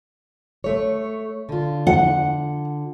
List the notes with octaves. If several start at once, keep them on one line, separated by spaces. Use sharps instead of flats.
A3 C#5
D3 F4
F#5